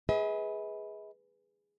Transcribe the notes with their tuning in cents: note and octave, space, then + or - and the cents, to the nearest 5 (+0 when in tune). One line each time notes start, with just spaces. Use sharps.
G#4 +0 B4 -5 D#5 +45